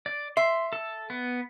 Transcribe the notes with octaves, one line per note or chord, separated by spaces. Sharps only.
D5
E5 C6
A4
B3